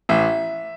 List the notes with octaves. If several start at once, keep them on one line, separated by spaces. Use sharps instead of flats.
A1 E5